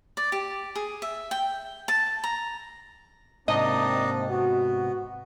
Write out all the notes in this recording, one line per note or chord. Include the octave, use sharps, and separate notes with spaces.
D5
G4
G#4
E5
G5
A5
A#5
G#2 C3 A#3 C4 D4 D#4 D#5
B3 F#4